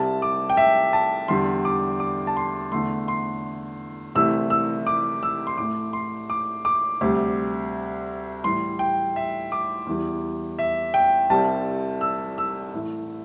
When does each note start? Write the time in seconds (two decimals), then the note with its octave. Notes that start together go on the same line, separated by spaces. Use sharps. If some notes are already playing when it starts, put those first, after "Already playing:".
Already playing: C2 C3 G3 A5
0.22 D6
0.50 G5
0.57 E5
0.93 A5
1.28 E2 D3 G3 C6
1.65 D6
2.00 D6
2.27 A5
2.37 C6
2.72 E2 D3 A3 C6
3.08 C6
4.15 C2 C3 E3 A3 E6
4.50 E6
4.87 D6
5.23 E6
5.47 C6
5.58 A2 A3 D6
5.93 C6
6.30 D6
6.65 D6
7.01 D2 C3 G3
8.44 A2 E3 G3 C6
8.79 G5
9.16 E5
9.52 D6
9.87 E2 E3 G3
10.59 E5
10.94 G5
11.30 C2 C3 G3 A5
12.01 E6
12.38 E6
12.73 A2 E3 A3